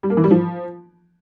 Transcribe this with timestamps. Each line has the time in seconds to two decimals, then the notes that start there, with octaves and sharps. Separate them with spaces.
0.03 G3
0.10 A#3
0.17 E3
0.24 G3
0.31 F3